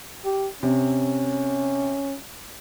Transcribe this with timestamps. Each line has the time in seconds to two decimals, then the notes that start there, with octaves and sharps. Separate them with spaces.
0.25 G4
0.63 C3 C#4